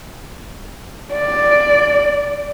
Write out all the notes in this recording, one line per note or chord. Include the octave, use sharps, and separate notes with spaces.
D5